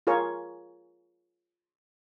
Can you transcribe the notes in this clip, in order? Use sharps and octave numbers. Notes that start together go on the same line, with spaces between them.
F4 G#4 A#4 C#5